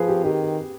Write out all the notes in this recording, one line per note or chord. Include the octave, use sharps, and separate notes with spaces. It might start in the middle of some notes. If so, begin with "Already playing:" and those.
Already playing: F3 G#4 B4
G4
D#3 G4